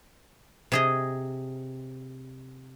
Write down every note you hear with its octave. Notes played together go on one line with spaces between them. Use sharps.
C3 G#4 D#5